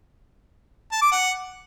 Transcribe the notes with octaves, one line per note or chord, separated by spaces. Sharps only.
A5
D6
F#5